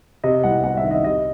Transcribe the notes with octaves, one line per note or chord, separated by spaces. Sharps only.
C3 D#5
C2 F#5
C2 F#5
E5
D#3
D#5
C3 D#5